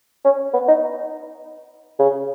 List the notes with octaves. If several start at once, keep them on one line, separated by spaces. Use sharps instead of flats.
C#4
B3
D#4
C#3